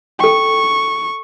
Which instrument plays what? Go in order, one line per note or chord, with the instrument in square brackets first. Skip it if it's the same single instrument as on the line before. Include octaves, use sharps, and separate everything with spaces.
[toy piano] A4 G5 [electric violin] C#6